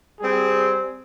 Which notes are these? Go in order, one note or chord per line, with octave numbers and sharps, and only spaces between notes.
G3 C4 G#4